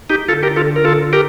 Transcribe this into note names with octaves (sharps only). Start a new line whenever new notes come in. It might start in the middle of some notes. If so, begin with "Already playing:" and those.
D#4 G4
D3 F4 A4
G4 A#4
F4 A4
A#4
F4 A4
G4 A#4